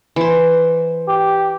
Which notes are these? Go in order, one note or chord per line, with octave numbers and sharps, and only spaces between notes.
E3 C5
G4